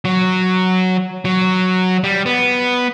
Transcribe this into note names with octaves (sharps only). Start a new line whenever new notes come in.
F#3
F#3
G3
B3